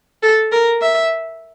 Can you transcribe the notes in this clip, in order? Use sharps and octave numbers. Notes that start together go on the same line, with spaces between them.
A4
A#4
E5